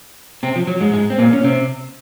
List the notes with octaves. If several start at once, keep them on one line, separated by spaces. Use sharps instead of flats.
C3 C4
F3
F#3
G#2 G#3
G#2 G#3
C4
A#2 A#3
C#4
C3 C4